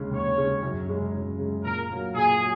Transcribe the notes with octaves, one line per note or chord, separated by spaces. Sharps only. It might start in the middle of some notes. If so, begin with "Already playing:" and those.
Already playing: D#2 C#3 G#3
D#2 C#5
C#3 G#3
F#2
C#3 G#3
F#2
C#3 G#3
A#2 A#4
F#3 A#3
A#2 G#4
F#3